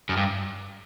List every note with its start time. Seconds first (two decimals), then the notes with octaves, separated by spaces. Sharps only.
0.09 F#2
0.17 G2